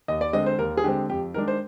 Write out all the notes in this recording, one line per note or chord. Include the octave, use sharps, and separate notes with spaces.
D#2 D#5
D5
D3 G#3 C4 D#5
C5
D#2 A#4
G#4
D3 G#3 C4 G4
F2 G4
D#3 G#3 D4 A#4
C5